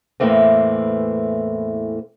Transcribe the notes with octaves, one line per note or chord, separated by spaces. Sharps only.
E2 A2 E3 A3 A#3 C4